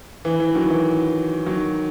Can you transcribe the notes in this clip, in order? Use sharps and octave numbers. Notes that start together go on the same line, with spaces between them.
E3
E3
D#3 F#3
E3
D#3 F#3